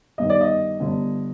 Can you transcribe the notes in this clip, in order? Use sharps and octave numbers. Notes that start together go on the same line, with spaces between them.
G1 G2 D#3 D#5
D5
D#5
G1 G2 D3